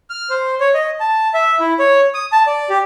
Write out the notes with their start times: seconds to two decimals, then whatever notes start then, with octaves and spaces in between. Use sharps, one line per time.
0.10 F6
0.30 C5
0.60 C#5
0.74 D#5
1.00 A5
1.34 E5
1.60 E4
1.79 C#5
2.14 D#6
2.32 A5
2.47 D5
2.70 G4